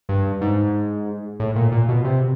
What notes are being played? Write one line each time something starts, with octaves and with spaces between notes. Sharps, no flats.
G2
G#2
A2
A#2
A#2
B2
C3